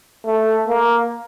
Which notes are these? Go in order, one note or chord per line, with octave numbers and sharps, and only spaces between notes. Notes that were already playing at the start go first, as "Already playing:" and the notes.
A3
A#3